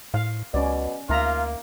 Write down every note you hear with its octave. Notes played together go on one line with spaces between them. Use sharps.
A2 F5
C#2 B2 C#4 D5
D2 A#3 D#4 F4 E5 A#5